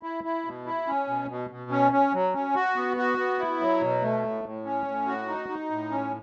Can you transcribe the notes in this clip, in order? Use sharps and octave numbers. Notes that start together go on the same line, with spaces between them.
E4
E4
B2
E4
C#4
B2
B2
B2
C#4
C#4
F#3
C#4
F#4
B3
F#4
B3
E4
F#3
B2
A3
A2
A2
C#4
A2
F#4
D#4
D#4
A2
C#4